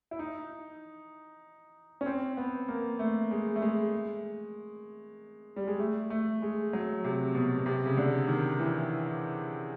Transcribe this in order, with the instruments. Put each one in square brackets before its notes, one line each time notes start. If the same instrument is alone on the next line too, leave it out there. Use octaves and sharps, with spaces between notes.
[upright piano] E4
D#4
C#4
C4
B3
A#3
A3
G#3
A3
G#3
G3
G#3
A3
A3
G#3
F#3
C3
B2
B2
C3
C#3
D3
D#3
E3